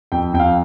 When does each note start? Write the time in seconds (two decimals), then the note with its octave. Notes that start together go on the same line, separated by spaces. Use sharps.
0.12 F2 G5
0.34 F2 G5
0.40 F5